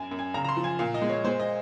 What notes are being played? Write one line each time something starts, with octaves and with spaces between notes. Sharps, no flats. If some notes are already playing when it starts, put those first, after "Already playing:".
Already playing: F#2 G#5
F#2
G#5
C#3 A#5
A#5
C6
F3
G#5
A#2 F5
D#5
G#3
C#5
G#3 C5
D#5